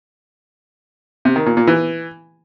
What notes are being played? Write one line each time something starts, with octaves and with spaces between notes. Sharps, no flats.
C3
D#3
A#2
A#2
E3